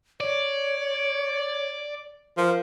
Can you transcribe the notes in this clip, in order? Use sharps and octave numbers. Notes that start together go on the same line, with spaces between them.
C#5 D5
F3 A#4